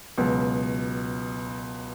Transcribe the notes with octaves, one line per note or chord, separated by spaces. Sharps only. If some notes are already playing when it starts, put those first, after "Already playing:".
C#2 B2 F#3 B3